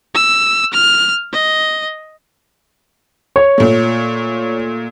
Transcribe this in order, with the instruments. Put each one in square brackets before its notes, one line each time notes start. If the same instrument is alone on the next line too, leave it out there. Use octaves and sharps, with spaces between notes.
[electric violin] E6
F6
D#5
[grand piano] C#5
[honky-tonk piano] A#2 A3